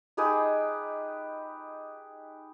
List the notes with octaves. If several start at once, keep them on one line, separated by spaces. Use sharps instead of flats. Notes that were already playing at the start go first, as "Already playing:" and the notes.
D#4 G4 G#4 B4